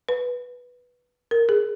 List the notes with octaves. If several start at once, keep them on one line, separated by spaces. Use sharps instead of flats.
B4
A#4
G#4